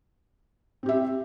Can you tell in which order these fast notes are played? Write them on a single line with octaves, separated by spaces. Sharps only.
C4 G4 E5